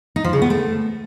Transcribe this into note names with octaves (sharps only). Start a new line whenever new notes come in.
D#4
F3
C#3
B3
A3